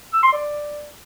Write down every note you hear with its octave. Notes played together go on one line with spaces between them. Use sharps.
E6
C6
D5